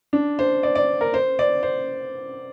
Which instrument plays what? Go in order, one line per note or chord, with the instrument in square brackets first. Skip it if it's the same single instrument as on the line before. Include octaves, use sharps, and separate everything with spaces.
[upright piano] D4
C5
D5
D5
A#4
C5
D5
C5